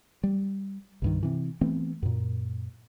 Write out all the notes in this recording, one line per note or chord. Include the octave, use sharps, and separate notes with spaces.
G3
C2 G2 D#3
C3 E3
E3 A3 B3 C4
F#2 A#2